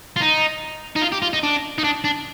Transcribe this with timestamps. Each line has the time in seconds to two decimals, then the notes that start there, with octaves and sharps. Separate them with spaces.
0.16 F4
0.21 D#4
0.96 D#4
1.02 F4
1.12 G4
1.22 F4
1.33 D#4
1.43 D4
1.78 D#4
1.84 D4
2.04 D4